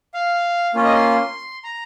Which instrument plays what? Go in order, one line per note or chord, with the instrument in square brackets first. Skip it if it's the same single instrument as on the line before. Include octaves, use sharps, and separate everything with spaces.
[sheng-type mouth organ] F5
A#3 C#4 F4
D#5
C6
A#5